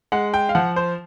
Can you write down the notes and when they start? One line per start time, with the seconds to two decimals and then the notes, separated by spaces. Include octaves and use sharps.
0.12 G#3 F#5
0.34 G5
0.49 F5
0.55 F3 F#5
0.76 C5